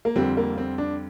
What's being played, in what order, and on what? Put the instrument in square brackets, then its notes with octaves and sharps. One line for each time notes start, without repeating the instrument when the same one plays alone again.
[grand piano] A#3
F2 D3 G3 C4
A#3
C4
D4